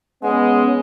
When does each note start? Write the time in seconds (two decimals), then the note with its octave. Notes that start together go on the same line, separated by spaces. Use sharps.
0.23 G#3 B3 C#4 F#5